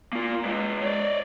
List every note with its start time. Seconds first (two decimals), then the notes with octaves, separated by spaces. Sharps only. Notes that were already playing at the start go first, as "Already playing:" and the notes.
0.13 A#3 F4
0.45 G#3 B4
0.81 C#5 D5